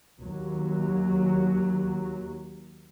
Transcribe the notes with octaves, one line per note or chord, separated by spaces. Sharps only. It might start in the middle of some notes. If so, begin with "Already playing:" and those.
D#2 F#3